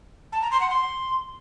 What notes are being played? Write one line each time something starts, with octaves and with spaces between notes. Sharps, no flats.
A5
A#5
C6
F#5
C6